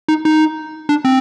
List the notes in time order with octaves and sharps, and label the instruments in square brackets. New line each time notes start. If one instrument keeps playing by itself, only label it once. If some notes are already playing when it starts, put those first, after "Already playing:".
[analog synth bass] D#4
D#4
D4
C4